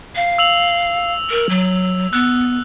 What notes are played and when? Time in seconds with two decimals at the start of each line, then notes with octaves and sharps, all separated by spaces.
0.16 F5
0.38 E6 F7 F#7
1.30 A#4
1.49 F#3
2.13 B3 E6 F#6